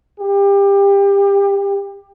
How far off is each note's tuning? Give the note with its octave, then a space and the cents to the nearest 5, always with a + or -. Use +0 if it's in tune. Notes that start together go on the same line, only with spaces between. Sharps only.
G4 +25